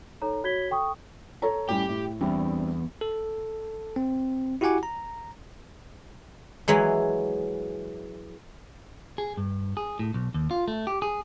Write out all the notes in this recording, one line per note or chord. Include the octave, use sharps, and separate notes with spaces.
D#4 A4 C#5 A#5
F#4 C#5 G#6 B6 G7
A4 G5 C#6 D#6
A4 C#5 A#5
A2 G3 C#4 G4 G5
A2
E2 G3 C4 D4
A4
C4
E4 F#4 G4 F#5 G#5 D6
A#5
E3 F#3 G#3
G#4
G2
G#4
A2
B1
D#2
F4
A3
G4
G#4